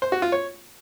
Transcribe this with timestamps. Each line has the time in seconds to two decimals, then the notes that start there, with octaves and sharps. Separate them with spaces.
0.02 C5
0.12 F#4
0.22 F4
0.32 C#5